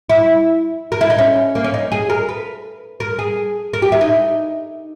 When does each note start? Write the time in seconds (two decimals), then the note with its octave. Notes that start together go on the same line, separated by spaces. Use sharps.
0.09 E4
0.92 A#4
1.01 E4
1.10 D#4
1.18 C#4
1.55 A#3
1.64 C#4
1.74 D#4
1.92 G#4
2.10 A#4
2.29 B4
3.00 A#4
3.19 G#4
3.73 A#4
3.82 G4
3.92 E4
4.01 D#4